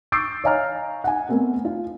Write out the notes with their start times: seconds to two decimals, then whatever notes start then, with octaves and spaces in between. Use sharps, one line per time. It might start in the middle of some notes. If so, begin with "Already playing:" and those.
0.12 C#6 E6 G6 A6 C7 D7
0.44 C#5 D#5 F5 G#5 A#5 F6
1.04 F#5 G#5
1.29 A3 B3 C4 A#4
1.65 F4